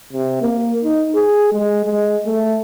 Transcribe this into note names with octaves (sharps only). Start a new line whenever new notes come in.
C3
A#3
D#4
G#4
G#3
G#3
A3